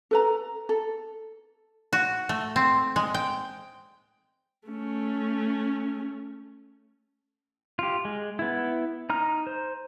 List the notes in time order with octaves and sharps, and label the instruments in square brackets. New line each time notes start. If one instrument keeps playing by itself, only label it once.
[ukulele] A4 B4 A#5
A4
[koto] F#4
A3
C4
G#3
G5
[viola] A3 C#4
[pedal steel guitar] F4 G4
G#3
B3 E4
D#4 A#5 F6
C5